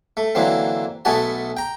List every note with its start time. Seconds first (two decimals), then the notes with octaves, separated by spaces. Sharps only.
0.17 A3
0.35 D3 E3 F#3 A#3 C4
1.05 B1 A3 B3 F#4 G#5 A5
1.57 G5 A#5